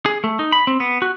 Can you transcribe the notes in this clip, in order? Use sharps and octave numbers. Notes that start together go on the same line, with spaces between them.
G#4
A3
D#4
B5
C4
B3
F#4